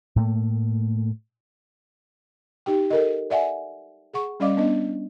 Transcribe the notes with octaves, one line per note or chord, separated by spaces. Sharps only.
A2 A3 A#3
D#4 G4 G5
A4 A#4 D#5
D5 E5 F#5 G#5
G#4 F#5 C#6
G3 C#4 D5 D#5 F5 D6
B3 D4 D#5